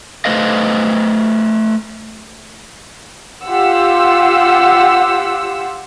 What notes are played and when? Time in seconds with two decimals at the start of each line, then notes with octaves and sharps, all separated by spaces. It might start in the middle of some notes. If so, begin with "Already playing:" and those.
0.25 A3 B4 C5 D#5 F5
3.45 F4 G4 F#5 E6